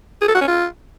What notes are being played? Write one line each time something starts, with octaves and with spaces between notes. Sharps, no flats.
G#4
A4
F#4
C#4
F4